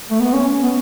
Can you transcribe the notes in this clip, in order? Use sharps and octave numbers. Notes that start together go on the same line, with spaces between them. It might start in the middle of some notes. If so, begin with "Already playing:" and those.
A3
B3
C#4
B3